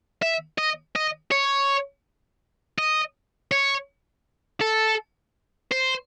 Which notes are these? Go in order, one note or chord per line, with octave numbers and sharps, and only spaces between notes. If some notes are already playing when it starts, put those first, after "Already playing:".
E5
D#5
D#5
C#5
D#5
C#5
A4
C5